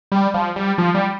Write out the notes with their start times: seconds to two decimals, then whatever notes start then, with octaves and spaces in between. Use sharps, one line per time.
0.12 G3
0.34 F3
0.56 G3
0.78 F3
0.95 G3